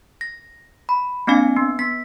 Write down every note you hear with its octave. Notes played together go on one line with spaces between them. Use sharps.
A#6
B5
A#3 C4 D4 F5 G#5 C#7
B3
B3 B6